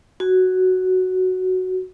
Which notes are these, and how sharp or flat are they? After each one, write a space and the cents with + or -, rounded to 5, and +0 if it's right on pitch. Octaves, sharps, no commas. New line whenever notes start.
F#4 +5